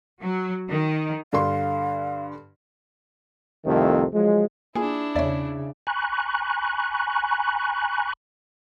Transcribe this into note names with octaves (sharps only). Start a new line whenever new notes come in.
F#3
D#3
G2 D3 F5 C6
C2 F2 C3 D#3 A3
F3 F#3 G#3
A#3 D4 E4 F4 G#4
E2 C#3 C#5 D5 E5
G#5 A#5 B5 C#6 F#6